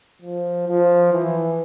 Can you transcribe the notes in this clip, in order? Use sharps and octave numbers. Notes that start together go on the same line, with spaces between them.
F3
F3
E3